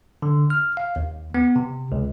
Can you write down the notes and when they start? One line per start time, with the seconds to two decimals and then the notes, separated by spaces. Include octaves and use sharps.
0.22 D3
0.50 F6
0.77 F5
0.96 D#2
1.34 B3
1.56 C3
1.92 C#2